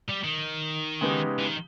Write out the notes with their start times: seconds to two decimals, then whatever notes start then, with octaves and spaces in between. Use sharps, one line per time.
0.09 G3
0.24 D#3
1.01 C#3 G#3 B3 D#4 G4
1.39 E3
1.47 D#3